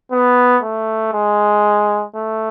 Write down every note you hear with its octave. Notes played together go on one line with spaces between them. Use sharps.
B3
A3
G#3
A3